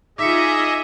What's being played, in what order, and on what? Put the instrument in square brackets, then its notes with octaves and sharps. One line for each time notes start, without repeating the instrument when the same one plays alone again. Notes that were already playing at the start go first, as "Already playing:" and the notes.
[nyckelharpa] D#4 F4 [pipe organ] G#4 D#5 [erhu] E5 [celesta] D6 B6 C#7